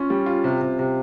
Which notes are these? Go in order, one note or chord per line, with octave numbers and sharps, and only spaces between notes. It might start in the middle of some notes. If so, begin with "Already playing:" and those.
Already playing: C#4 F4
G3
F4
C3
C3
C3